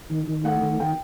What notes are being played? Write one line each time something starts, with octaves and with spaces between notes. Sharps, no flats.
D#3
D#3
A3 F#5
D#3
D#3 G5